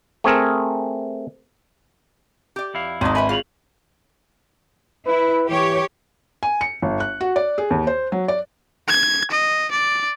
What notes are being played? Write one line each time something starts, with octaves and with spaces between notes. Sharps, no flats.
A3 C4 G#4 A#4
G4 D5
F2 E4 F5
G#1 D4 D#4 D#5 C6
D4 B4 E5 G#5 B5
F4 G#4 C#5 F7 F#7
E4 B4
E3 G4 C#5
G#5
C#7
G1
F#6
F#4
D5
G#4
D#2
C5
F#3
D5
G#6
D#5
D5